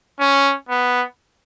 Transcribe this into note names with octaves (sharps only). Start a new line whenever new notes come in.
C#4
B3